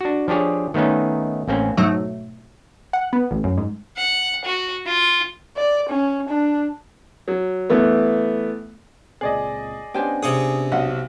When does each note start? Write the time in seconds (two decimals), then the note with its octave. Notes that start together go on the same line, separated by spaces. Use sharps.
0.01 D4 F#4
0.28 F3 D4 G4 G#4 C#5
0.74 D#3 A3 B3 C#4 D#4
1.48 A1 A#3 C4 C#4
1.77 G#2 B2 F#3 A3
2.93 F#5
3.13 B3
3.31 A1
3.44 F#2
3.58 G#2
3.97 F#5
4.45 F#4
4.86 F4
5.56 D5
5.89 C#4
6.29 D4
7.28 F#3
7.70 E3 A3 B3
9.21 C#2 A#2 C4 G#4 D5 D#5
9.94 B3 C#4 D4 G4 C5 G#5
10.23 C3 G#4 C#6 D#6
10.72 B1 D#5 F#5